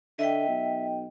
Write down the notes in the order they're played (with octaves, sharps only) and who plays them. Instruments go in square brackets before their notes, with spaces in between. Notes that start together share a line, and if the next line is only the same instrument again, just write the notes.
[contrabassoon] D3 [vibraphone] D#5 G5 [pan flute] E5
[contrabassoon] B1